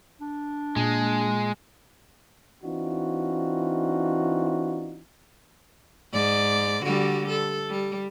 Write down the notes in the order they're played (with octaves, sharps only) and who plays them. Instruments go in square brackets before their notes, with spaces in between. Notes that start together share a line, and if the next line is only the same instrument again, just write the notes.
[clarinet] D4
[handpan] A#2 [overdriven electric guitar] G#3
[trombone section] E3 C4 D4 D#4 F4 F#4
[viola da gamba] G#2 D5
D3 G3 F#4
A4
G3